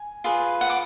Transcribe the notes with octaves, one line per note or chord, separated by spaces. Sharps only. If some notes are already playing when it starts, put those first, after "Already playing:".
Already playing: G#5
F4 G#4 B4
F#5
D6